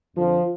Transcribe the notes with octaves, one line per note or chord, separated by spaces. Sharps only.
F2 D3 F3